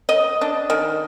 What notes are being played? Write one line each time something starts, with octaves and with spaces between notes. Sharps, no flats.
D#5
D4
D#3